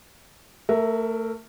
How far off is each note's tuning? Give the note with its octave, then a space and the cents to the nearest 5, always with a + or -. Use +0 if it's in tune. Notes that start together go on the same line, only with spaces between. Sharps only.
A3 +30 A#4 +0 E5 +0